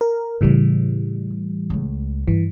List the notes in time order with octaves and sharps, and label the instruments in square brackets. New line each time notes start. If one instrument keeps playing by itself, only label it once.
[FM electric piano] A#4
[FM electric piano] A2 E3 G3 [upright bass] C#3 E4
[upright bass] C#2 A3
[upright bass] G2 [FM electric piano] E3